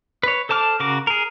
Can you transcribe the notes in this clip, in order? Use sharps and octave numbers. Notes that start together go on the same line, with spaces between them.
B4 C#5
A4 C5 A5 D6 F6
C#3 F#4 A#4 D6
G#4 A#4